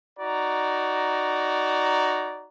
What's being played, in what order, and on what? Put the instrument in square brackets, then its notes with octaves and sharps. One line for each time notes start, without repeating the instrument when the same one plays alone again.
[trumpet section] D#4 F#4 D5 A#5